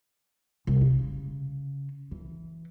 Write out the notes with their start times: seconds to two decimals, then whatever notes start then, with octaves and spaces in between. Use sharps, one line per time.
0.67 C2
0.81 C#3
2.11 E3